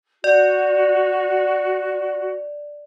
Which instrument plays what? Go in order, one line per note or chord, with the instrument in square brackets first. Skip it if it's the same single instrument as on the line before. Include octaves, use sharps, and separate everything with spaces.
[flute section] F#4 [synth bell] D5